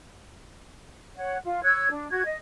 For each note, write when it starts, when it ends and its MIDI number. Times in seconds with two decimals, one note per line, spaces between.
1.16 1.37 73
1.16 1.37 78
1.45 1.63 65
1.64 1.89 73
1.64 1.89 88
1.64 1.89 90
1.64 1.89 92
1.92 2.08 62
2.11 2.23 66
2.11 2.23 92
2.25 2.37 75